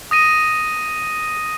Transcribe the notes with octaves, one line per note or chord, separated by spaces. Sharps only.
D#6 A#6 D#7